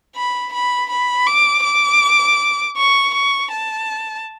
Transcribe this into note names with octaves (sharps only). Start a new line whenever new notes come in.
B5
B5
B5
D6
D6
C#6
C#6
A5